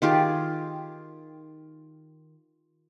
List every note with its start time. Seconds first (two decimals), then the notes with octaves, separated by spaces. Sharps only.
0.02 D#3 F4 G4 G#4